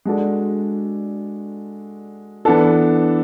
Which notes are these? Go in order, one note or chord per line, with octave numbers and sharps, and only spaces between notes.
G#3 D4 F#4 A4 D5
E3 B3 D4 A4